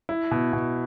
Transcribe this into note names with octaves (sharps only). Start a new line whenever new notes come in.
E4
B2
B2